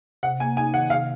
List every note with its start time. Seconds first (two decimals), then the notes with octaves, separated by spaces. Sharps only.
0.23 C3 F#5
0.40 A#3 G#5
0.57 D#4 G#5
0.74 D#3 F#5
0.90 C3 F5